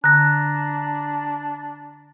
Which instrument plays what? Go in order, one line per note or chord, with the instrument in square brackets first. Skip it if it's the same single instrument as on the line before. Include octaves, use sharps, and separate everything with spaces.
[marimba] D3 [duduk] D4 [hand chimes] A#5 A#6 [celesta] F#6